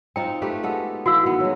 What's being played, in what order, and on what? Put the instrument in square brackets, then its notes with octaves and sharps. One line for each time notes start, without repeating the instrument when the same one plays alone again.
[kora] C4 D#4 F4 [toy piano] G5
[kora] A3 G4 B4
G#3 B3 A4
[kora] E3 [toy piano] F#4 F5 E6
[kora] D#3 B3
F#3 G#3